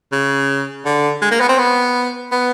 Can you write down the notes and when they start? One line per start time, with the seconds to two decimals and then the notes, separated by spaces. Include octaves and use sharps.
0.12 C#3
0.86 D3
1.22 G#3
1.31 A#3
1.40 B3
1.49 C4
1.59 B3
2.32 B3